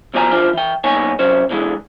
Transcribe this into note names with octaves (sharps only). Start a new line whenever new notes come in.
E2 B2 F3 C#5 G#5 A#5
E3 D4 F4 C5
E3 G5
B1 A#2 B3 D#4 C#5 G#5
C3 F#3 C#4 C5
B2 D3 E3 G#3